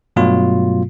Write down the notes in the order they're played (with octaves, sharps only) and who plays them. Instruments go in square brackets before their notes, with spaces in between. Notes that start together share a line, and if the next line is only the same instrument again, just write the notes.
[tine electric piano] G2 B2 F#3 A3 F4